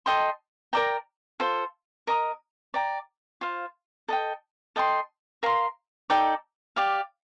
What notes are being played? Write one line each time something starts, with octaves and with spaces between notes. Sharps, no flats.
A4 D#5 G5 C6
A#4 D5 G5 A#5
F4 A4 C5
A#4 D#5 A#5 D#6
D5 G5 A#5
F4 C5 F5
A4 D#5 G5
A4 D#5 G5 C6
A#4 F5 C6
D#4 A4 D5 G5
G4 D5 F5